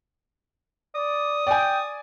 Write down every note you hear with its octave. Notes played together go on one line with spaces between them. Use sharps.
D5 D#6
D5 G5 G#5